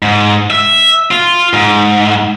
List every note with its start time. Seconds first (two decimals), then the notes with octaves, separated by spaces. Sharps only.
0.03 G#2
0.50 E5
1.11 F4
1.53 G#2